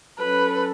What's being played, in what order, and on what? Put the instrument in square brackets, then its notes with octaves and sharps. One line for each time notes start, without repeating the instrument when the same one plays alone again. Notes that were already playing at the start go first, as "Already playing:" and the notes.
[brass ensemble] F#3 C#4 A4 [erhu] B4